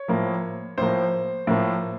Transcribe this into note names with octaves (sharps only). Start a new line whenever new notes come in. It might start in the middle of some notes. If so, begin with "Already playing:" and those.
Already playing: C#5
A2 F3 A#3
A2 F3 A#3 C5
A2 F3 A#3